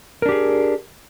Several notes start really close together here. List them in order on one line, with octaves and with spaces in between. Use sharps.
A#4 D4 G4 G#4